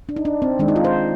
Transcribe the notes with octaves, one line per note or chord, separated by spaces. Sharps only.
D4
D#4
D4
C4
D#3 G#3 D4
D#4
F4
C5